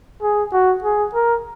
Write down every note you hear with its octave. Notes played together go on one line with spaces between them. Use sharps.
G#4
F#4
G#4
A#4